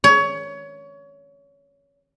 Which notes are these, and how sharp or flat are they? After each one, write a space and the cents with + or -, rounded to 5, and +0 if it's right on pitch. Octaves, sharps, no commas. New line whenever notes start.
C#5 +25